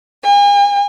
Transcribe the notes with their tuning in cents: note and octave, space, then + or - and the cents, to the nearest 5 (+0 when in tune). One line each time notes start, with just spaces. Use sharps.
G#5 -40